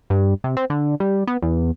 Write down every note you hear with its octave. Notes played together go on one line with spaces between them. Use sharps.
G2
C3
C4
D3
G3
B3
E2